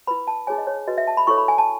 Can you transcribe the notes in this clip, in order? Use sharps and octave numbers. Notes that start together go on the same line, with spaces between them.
E4 B4 B5
A5
D#4 G#4 C#5 G#5
D#5
C#5
C#5
F#4 B4 D#5
E5
A5
B5
E4 A4 C#5 C#6
B5
G#5
A5